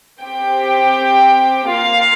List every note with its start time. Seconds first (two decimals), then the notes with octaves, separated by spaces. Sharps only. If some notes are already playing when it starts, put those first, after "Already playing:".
0.22 C4 G4 G5
1.69 A#3 F4 F5